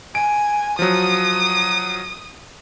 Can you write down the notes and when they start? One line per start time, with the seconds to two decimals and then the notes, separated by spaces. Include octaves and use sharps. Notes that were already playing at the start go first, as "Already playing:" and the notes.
0.15 G#5 D7
0.79 F3 F#3 D#6